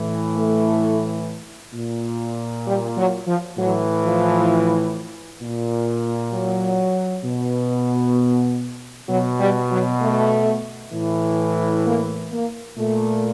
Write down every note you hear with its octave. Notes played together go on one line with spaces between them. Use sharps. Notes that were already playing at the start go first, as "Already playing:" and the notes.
Already playing: A2 E3
A3
A#2
G3
F#3
F3
A2 E3 F#3
F3
A#2
F#3
B2
B2 F#3
G3
F#3
A3
A2 E3
A#3
A#3
A#2 A3